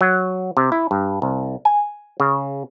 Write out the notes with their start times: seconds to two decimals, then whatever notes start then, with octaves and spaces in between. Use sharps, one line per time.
0.01 F#3
0.57 C3
0.72 E4
0.91 G2
1.22 C2
1.65 G#5
2.20 C#3